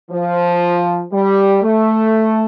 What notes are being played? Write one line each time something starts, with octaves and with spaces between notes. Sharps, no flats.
F3
G3
A3